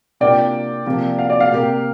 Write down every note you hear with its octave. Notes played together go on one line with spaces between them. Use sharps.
C3 A#3 D4 F4 A#4 D5 G5
C3 F3 A#3
F5
D5
F5
C3 A#3 G4 A#4